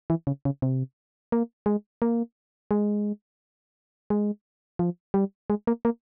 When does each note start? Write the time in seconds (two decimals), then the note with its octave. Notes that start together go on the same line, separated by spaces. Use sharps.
0.10 E3
0.27 C#3
0.45 C#3
0.62 C3
1.32 A#3
1.66 G#3
2.02 A#3
2.71 G#3
4.10 G#3
4.79 F3
5.14 G3
5.50 G#3
5.67 A#3
5.85 A#3